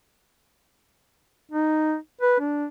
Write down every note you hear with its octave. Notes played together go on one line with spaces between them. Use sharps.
D#4
B4
D4